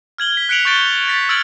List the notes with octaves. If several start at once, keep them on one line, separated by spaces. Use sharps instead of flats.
F6 G#6 F#7 G7
B6
F#6 B6 C#7 D7 F7 F#7
C#6 F#6 G6 A6 D7 G7
G6 A6 B6
E6 F6 G#6 A6 D7 F#7